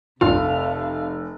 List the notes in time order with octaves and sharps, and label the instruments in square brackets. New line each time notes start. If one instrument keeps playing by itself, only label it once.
[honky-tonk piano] F1 [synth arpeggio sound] A#1 G2 F4 [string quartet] C3 A3 [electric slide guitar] F5